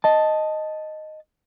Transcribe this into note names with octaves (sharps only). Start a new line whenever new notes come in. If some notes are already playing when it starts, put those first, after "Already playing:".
D#5 A5